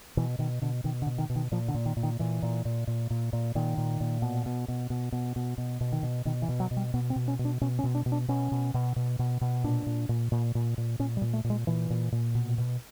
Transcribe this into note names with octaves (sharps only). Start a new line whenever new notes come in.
B2 E3
B2 D#3
B2 D3
B2 D#3
D3
B2
D#3
B2
D#3
A#2 F3
D3
A#2
D#3
A#2
D#3
A#2 E3
A#2
A#2
A#2
A#2
A#2
A#2 D#3
A#2
A#2
B2
B2
B2
B2
B2
B2
B2
B2
D#3
B2
B2 D#3
E3
B2
F#3
B2
G3
B2 B3
C4
B2
C#4
B2
D4
B2 C#4
C#4
B2
D4
B2
D4
B2 C#4
B2
B2
B2
B2
B2
A#2 D4
A#2
A#2
A#2
A#2
A#2
A#2 C#4
G3
A#2
A3
A#2
G#3
A#2 E3
A#2
A#2
B2
B2